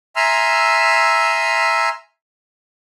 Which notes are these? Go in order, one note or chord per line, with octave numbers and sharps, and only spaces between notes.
E5 G#5 A#5 C6 E6 F6